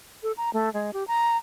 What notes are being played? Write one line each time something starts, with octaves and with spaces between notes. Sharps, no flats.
A4
A#5
A3
G#3
G4
A#5